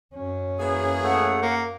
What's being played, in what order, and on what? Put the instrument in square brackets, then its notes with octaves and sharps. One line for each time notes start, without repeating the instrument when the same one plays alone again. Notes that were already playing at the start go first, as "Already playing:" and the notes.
[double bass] F#2 C#4
[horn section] E3 A#3 G#4
[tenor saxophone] A3 [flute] F#5
[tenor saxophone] A#3